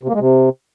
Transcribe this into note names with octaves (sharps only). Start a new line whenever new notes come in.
C3
A#3
G#3
C3